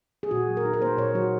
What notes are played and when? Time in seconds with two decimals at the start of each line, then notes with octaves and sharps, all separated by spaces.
0.23 G#4
0.31 A#2 F#4
0.48 F#3
0.57 A#4
0.65 D#4
0.73 A#4
0.81 A#3 C5
0.97 A#2 C#5
1.14 F#3 F#4